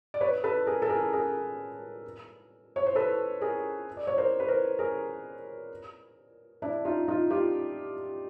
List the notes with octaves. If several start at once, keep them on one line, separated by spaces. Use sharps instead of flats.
D5
B4 C#5
A4 B4
G#4 A#4
A4
G#4 A#4
G#4 A#4
C#5
C5
A4 B4
G#4 A#4
D5
C#5
A#4 C5
B4
A#4 C5
G#4 A#4
D4 E4
D#4 F4
D#4 F4
F4 G4